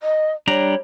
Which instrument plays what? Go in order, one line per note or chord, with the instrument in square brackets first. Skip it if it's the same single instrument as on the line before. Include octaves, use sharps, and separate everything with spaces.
[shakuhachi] D#5
[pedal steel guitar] G3 D4 A#5 [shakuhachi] C#5